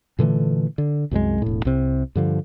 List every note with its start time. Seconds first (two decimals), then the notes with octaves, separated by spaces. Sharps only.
0.19 A#2 D3 E3 A3
0.78 D3
1.11 C2 F#2 G3 G#3
1.42 E1 A2
1.65 C2 C3
2.15 G2 D3 F3